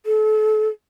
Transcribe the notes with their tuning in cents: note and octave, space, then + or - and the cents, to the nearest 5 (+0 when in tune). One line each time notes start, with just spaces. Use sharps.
A4 -35